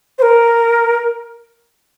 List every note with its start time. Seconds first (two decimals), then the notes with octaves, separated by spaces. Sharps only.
0.18 C5
0.22 A#4